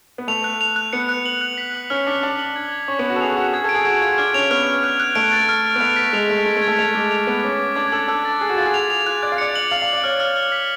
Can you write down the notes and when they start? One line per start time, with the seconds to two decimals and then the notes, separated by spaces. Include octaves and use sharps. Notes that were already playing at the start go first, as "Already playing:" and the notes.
0.18 B3
0.28 A3 F7
0.44 F#6
0.61 F7
0.76 F#6
0.93 B3 C#7
1.09 F#6
1.26 F#7
1.41 F#6
1.58 B6
1.75 F#7
1.90 C#4 F6
2.07 D4 B6
2.23 D4 F6
2.39 F#7
2.56 G#6
2.72 G#6
2.88 C#4 C#6
2.99 B3
3.05 C#6
3.10 F#4
3.16 A4
3.21 G#4 F7
3.37 F#4 C#6
3.53 G#4 G#6
3.64 A4 D7
3.75 G#4
3.85 F#4 G#6
4.02 F4 G#6
4.18 D4 F6
4.34 C#4 F7
4.51 B3 F6
4.67 F6
4.84 F#6
5.00 F#6
5.15 A3 D7
5.32 A6
5.49 F6
5.65 F6
5.76 B3
5.80 A3 F7
5.96 B6
6.13 G#3 F7
6.30 A3 D7
6.46 G#3 G#6
6.57 A3
6.62 G#6
6.68 A3
6.79 A3 F7
6.95 G#3 D6
7.11 F7
7.27 B3 F7
7.43 C#4 D6
7.60 D6
7.76 D4 G#6
7.92 A4 F#7
8.08 A4 F#6
8.25 A6
8.41 G#4 F#6
8.49 F#4
8.57 F4 A6
8.66 G#4
8.74 F7
8.90 G#4 F7
9.06 F4 F#6
9.22 D5 F#6
9.32 F5
9.38 D5 C#7
9.55 F#7
9.71 F5 F#7
9.82 F5
9.88 F#7
9.93 D5
10.04 C#5 F6
10.20 F6
10.36 F6
10.52 B6